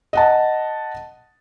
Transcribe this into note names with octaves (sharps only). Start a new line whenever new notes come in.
D#5 F#5 A5